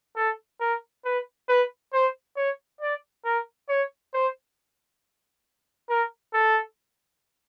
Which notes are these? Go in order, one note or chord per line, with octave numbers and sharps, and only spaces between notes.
A4
A#4
B4
B4
C5
C#5
D5
A#4
C#5
C5
A#4
A4